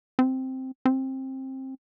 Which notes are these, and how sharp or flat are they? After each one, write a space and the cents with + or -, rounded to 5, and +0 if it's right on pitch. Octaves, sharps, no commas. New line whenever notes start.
C4 +0
C4 +20